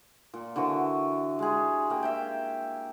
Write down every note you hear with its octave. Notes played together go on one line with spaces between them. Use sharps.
A#2
D3 E3 F#4 C#6
G#3 G#4
A#3 G5
E5 F5 G5